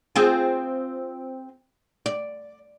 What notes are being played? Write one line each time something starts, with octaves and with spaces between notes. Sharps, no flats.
C4 F4 G#4
D5